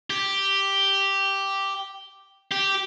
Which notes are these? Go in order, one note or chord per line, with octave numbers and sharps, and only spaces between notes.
G4
G4